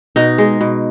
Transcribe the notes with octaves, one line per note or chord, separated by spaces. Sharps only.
B2 D#4
G#3
B2